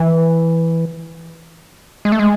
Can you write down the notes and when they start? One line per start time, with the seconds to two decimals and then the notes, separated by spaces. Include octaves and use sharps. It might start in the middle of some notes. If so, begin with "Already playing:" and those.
Already playing: E3
2.05 G#3
2.12 A3
2.19 G#3